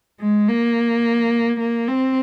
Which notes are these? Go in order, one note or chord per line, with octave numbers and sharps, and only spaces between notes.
G#3
A#3
A#3
C4